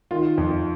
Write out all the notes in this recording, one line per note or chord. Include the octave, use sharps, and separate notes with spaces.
D#3 F4
F2